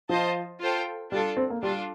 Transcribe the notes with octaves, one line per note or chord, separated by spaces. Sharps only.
F3 F4 C5 D#5 A5
F4 A4 C5 G5
G3 D4 F4 A4
C4
A#3
G3 D4 F4 A4